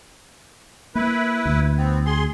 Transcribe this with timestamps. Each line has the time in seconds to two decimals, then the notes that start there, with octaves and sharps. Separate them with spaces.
0.95 A#3 E4 B4
1.46 D2
1.78 B3 C4
2.06 G#4 C6